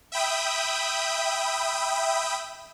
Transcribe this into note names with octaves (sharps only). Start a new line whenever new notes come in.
E5 G5 B5 D#6